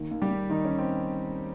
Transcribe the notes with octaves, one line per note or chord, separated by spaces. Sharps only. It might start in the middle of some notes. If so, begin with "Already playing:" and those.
Already playing: D#2 D#3
D#2
G3 G4
D#2
D#3 D#4
D#3 C#4
C4